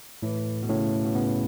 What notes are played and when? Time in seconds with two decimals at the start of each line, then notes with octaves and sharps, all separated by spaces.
0.23 A2 E3
0.62 B2
0.69 A2 C#3
1.04 B2
1.15 C#3 B3